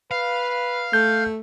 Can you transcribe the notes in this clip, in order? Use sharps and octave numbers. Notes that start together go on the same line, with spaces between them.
B4 F5
A3 G6